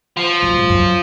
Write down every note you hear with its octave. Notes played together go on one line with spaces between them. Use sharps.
F3
F#2
G#2
F#2